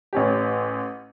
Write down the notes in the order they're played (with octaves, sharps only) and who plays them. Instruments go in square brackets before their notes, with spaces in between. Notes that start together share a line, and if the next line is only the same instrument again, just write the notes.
[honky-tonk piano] A1 C#4 G4